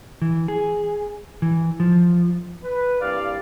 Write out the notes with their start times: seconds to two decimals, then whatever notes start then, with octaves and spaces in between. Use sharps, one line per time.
0.22 E3
0.48 G#4
1.42 E3
1.80 F3
2.64 B4
3.01 C2 G2 D5 F5